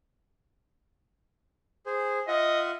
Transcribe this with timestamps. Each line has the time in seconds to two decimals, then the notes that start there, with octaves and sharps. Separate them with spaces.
1.86 G#4 C5
2.28 F4 D#5 E5 F#5